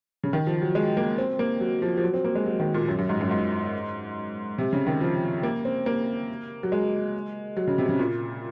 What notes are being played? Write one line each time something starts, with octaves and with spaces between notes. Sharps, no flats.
C#3
D#3
F3
F#3
G#3
A#3
C4
A#3
F#3
F3
F3
F#3
C4
A#3
G#3
F#3
D#3
A#2
F#2
F#2
G#2
F#2
G#2
C3
C#3
D#3
F3
A#3
C4
A#3
F#3
G#3
F#3
C#3
C3
C#3
A#2